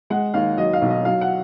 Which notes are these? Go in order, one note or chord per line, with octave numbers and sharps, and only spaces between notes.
G#3 F#5
D#2 F5
F#3 D#5
F5
B1
D#5
F#3 F5
F#5